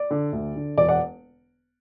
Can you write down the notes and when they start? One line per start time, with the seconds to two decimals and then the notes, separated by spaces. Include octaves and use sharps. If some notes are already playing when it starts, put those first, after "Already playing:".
Already playing: D5
0.11 D3
0.32 D2
0.56 D3
0.78 E1 D5
0.89 D5 F#5